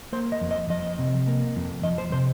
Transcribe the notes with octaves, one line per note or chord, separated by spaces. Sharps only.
A#3 C5
D#5
F2
D#5
F3 D#5
C3
A#3
F2
F3 D#5
C5
C3 C5